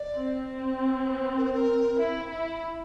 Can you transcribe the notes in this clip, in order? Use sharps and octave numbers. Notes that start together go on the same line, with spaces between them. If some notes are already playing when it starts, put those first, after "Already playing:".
Already playing: D5
C4
A#4
C5
A#4
E4
E4